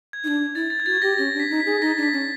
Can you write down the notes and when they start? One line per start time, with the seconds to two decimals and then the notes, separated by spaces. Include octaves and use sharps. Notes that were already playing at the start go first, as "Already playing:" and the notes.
0.13 G#6
0.24 D#4
0.28 D4
0.55 E4 A6
0.70 A6
0.80 G#6
0.86 F#4 A6
1.02 G4 A#6
1.18 C#4 A#6
1.34 D4
1.40 B6
1.50 D#4
1.60 B6
1.66 G#4
1.81 D#4 A#6
1.98 D4
2.03 B6
2.13 C#4